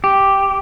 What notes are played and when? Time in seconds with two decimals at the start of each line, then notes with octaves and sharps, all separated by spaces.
0.04 G4